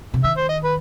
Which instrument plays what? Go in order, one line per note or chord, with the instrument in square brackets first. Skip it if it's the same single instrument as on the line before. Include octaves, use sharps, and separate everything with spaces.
[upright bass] C3
[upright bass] D#3 [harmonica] E5
[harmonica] C5
D#5
B4